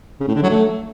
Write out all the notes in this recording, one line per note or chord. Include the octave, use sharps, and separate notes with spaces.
C#3
A2
D3
F#3
A3